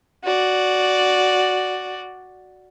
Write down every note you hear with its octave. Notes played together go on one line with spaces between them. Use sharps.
F#4 D5